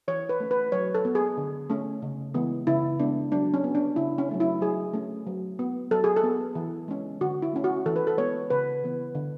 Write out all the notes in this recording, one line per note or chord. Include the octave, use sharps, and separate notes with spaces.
E3 C#5
B4
A3 C#4
B4
F#3 C#5
A4
B3
G#4
D3
A3 C#4
C#3
E3 G#3 B3
C#3 E4
G#3 B3 D4
F#3 D4
C#4
B3
D4
C#3 E4
C#4
F#3 A3 C#4
E4
F#3 G#4
A3 C#4
F#3
B3
F#3 A4
G#4
A4
B3
E3
G#3 C#4
D3 F#4
E4
A3 C#4
F#4
E3 A4
B4
A4
G#3 B3 C#5
C#3 B4
E3 B3
D3